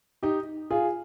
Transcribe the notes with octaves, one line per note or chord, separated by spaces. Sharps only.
D#4 G4
F4 G#4